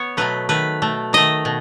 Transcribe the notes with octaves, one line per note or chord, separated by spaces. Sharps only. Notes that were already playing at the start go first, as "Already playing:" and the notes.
Already playing: B3 C#5
B2 F#3 A3 B4
D#3 A3 B4
B2 A3
D#3 A3 D#5
B2